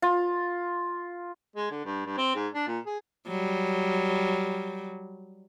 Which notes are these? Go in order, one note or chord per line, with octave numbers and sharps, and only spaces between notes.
F4
G#3
D3
G2
G2
C4
G#2
D4
A#2
G#4
F#3 G3